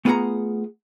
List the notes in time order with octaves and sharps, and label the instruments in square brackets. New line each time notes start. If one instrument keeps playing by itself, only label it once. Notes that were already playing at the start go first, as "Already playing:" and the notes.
[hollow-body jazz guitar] A3 B3 F4 G#4 F#5 A#5